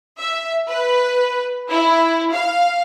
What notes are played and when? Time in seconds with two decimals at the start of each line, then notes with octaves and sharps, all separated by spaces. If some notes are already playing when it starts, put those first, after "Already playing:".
0.17 E5
0.68 B4
1.70 E4
2.33 F5